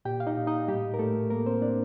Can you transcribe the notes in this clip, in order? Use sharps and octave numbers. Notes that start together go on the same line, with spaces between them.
A#2 G4 G5
F5
D#4 D#5
A#2
D#4 D#5
A2 G3 G4
A#4
A2 A3 A4
G3 A#3 A#4
C4 C5
D4 D5